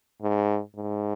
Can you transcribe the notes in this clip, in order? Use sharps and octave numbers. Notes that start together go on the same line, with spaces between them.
G#2
G#2